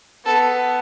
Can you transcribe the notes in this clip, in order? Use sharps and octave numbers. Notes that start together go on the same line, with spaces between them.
B3 A4